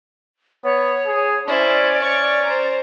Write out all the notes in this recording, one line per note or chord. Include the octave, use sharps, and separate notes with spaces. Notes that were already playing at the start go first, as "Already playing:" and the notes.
B3 C#5
G#4
C#4 E4 C5 D5
C#5 C#6
C5 A#5